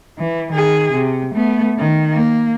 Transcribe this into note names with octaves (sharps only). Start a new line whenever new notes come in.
E3
D#3 G#4
C3
A3 B3
D#3
A#3